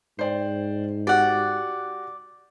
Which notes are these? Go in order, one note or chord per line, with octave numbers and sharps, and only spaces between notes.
G#2 C5 D5 G5
F#4 G4 D5 F#5